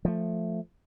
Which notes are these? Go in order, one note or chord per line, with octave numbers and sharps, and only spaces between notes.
F3 A3